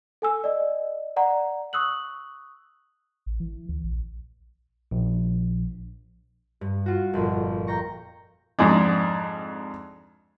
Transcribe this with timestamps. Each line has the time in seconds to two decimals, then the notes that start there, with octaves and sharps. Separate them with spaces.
0.22 A4 G#5 E6
0.44 D5 D#5
1.16 D5 F#5 A#5
1.73 C#6 D#6 E6 F#6 F#7
3.26 A1
3.40 E3
3.69 D2
3.84 A#1
4.91 A#1
6.61 G2
6.86 F4 F#4
7.13 G1 F2 A#2
7.67 G5 A#5 C#6
8.59 F2 G#2 G#3 D4